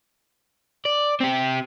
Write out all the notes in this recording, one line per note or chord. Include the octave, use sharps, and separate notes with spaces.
D5
C4 G4